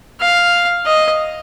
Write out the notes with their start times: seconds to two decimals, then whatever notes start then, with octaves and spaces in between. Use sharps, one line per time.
0.20 F5
0.86 D#5